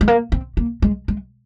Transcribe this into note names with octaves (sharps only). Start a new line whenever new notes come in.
G#3
A#3
C4
A#3
G#3
G#3